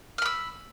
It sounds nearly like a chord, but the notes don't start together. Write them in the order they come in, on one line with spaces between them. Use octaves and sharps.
F6 B5 E6